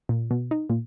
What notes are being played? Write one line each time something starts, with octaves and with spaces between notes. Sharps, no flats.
A#2
B2
D#4
A#2